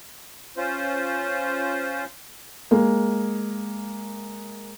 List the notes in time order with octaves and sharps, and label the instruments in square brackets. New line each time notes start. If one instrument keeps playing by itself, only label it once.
[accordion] C#4 F4 C5
[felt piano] G#3 A#3